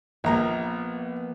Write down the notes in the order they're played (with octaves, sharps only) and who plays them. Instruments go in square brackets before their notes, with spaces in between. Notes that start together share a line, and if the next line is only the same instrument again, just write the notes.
[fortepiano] A#1 A#5 [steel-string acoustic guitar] F3 A#3 B3